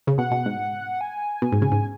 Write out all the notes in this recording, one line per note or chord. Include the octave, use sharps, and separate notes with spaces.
C#3
B2 F#5
B2
G#2
G#5
B2
G#2
C#3
G#2